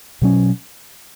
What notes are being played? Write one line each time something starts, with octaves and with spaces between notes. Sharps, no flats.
B2 F#3 C#4